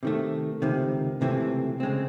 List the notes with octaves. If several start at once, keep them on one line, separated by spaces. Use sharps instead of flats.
C3 D#3 A3
C#2 C3 D#3
C#2 C3 E3 A3 C4
C#3 G#3 C4